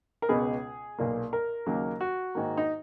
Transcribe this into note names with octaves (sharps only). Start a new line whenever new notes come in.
A#4
C#2 B2 G#3 B3 G#4
B1 A#2 A#3
A#4
D#2 C#3 F#3 A#3
F#4
G#2 D#3 A#3
D#4